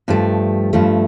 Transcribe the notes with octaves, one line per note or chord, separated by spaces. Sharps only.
G2 F3 A3
G2 F3 A3